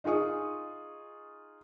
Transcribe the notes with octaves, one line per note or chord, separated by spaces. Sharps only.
D#4 F4 G#4 C#6 D#6